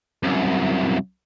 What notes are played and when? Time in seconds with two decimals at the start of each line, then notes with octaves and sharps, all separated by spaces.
0.23 C2 F#2